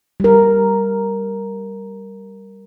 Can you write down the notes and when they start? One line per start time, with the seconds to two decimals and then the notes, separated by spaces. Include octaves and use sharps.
0.20 G3 A#4